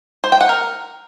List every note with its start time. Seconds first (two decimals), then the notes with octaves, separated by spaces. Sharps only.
0.24 C5
0.32 G5
0.41 F#5
0.49 A#4